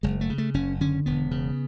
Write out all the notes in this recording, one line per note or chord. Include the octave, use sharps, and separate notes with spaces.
F#1 G#3
A3
C#3
A3
F#1 C#4
D3 C#4
E1 B3
C#3